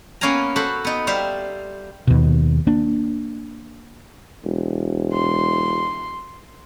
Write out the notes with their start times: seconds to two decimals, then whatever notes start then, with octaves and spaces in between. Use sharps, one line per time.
0.21 A#3 B3 C#4 F5 G#5 A#5
0.56 F#4 A4 C5 B5
0.85 B3 D#4
1.07 G3 C5 E5 F5
2.07 D#2 B2
2.67 A#3 D4
4.44 E1
5.13 C6